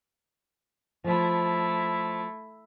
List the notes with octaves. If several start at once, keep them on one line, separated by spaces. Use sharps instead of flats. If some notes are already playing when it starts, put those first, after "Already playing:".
F3 A3 E4